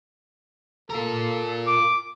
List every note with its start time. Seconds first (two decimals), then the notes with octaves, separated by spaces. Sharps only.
0.90 F4 A4 A#4
1.67 D6